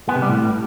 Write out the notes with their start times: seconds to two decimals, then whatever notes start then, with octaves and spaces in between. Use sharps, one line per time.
0.09 B3
0.15 C3
0.22 G3
0.29 A2